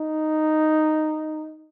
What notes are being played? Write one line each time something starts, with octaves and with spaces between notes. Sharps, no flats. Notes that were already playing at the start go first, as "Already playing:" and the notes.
Already playing: D#4